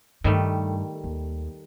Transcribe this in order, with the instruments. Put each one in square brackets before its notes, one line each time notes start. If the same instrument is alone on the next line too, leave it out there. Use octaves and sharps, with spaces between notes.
[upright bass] G2 [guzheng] D#3 G3 A3
[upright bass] D#2